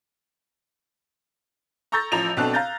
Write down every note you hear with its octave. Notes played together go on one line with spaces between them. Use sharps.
A#5 C#6 E6 G6 A6 A#6
A1 F3 A#5 F7
B1 B2 C4 D4 A4 F#6
F5 A#5 G6 A6